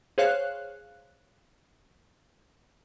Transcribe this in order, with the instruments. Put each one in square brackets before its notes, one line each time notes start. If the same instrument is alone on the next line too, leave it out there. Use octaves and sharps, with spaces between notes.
[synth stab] G#4 C5 C#5 F5 F#6